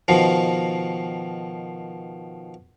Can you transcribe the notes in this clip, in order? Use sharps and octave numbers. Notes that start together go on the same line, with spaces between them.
B2 D#3 F3